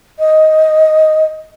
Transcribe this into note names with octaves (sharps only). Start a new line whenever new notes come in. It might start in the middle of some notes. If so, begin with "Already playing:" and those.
D#5